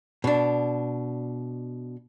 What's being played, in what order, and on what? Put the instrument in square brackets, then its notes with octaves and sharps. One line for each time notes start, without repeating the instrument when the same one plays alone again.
[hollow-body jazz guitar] B2 D4